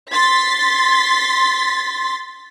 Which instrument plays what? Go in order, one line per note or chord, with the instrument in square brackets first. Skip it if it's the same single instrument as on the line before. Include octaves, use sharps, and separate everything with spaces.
[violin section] C6 A6 B6